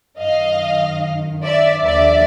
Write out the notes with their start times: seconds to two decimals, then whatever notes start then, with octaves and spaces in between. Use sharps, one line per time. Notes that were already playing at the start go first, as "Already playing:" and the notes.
0.19 F#2 D#3 D#5 F5
1.44 D5 E5
1.85 D#2 D3 F3 D5 E5